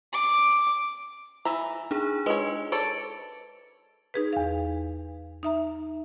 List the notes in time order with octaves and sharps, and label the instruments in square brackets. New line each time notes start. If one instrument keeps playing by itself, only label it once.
[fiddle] D6
[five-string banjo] E3 E5 A#5
[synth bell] D4 D#4 G#4
[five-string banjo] G#3 C#5 [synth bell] B4
[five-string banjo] A4 C#5 D5 [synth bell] C#7 D7
[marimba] D#4 G#4 B4
E2 F5
D#4 E5 A#5